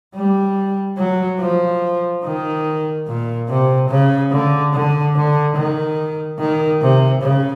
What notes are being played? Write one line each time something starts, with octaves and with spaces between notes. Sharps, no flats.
G3
F#3
F3
D#3
A#2
C3
C#3
D3
D3
D3
D#3
D#3
C3
C#3